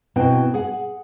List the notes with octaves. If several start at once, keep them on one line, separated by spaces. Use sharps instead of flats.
B2 C4 E4 G5
G#4 F#5